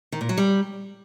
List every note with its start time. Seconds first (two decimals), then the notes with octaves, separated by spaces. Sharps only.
0.12 D#3
0.21 A#2
0.29 F#3
0.38 G3